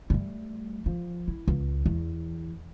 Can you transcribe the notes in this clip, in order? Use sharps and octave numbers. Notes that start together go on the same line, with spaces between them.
G3 A3
F3
E4
C#2
E2